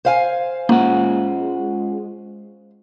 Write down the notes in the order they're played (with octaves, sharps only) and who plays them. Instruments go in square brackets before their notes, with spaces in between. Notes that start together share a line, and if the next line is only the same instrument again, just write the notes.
[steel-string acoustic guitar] C5 F5 G#5
[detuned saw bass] G#3 [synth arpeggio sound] A#3 [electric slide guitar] C#4 F4 F#5